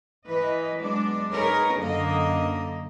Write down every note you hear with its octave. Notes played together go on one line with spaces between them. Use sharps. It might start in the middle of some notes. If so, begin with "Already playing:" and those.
E3 B4 D#5
F#3 G#3 B3 D4 D5
D#4 G#4 A#4 B4 C#5
F#2 D3 F#3 A#3 D#5